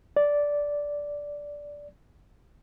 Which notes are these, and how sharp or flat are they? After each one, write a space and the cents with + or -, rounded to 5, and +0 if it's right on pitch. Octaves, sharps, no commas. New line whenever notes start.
D5 -10